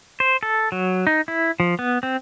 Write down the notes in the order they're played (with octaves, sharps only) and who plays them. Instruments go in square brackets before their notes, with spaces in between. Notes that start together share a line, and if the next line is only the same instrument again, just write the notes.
[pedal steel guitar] C5
A4
F#3
D#4
E4
F3
B3
C4